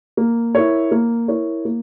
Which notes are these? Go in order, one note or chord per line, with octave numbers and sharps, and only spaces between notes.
A#3
E4 A#4 C#5
A#3
E4 A#4 C#5
A#3